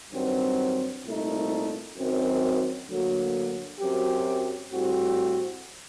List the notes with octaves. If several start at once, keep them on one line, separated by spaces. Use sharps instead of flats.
G2 D#3 F#3 C4
C2 A#2 A3 D#4
F#2 D#3 F#3 C4
D2 D3 F#3 A#3
F#2 F#3 C4 G4
A2 G3 C4 F#4